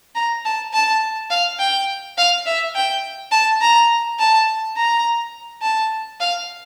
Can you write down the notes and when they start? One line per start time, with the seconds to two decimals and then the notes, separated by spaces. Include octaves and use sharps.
0.15 A#5
0.45 A5
0.73 A5
1.30 F5
1.59 G5
2.18 F5
2.46 E5
2.75 G5
3.32 A5
3.61 A#5
4.19 A5
4.76 A#5
5.62 A5
6.20 F5